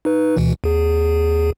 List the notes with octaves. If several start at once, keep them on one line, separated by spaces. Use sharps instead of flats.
D#4 B4
D2 B2 E3
D#2 G#4